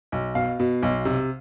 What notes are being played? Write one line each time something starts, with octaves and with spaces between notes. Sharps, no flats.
B1
B2 F5
B2
B1
C3